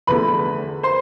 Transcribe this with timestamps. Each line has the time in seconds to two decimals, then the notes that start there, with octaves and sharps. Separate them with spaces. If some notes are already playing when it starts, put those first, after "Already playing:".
0.07 E2 D3 F3 A3 B4 B5
0.83 C5 C6